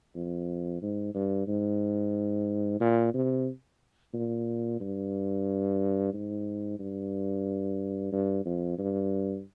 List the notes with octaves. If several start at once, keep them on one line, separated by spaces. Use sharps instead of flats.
F2
G#2
G2
G#2
A#2
C3
A#2
G2
G#2
G2
G2
F2
G2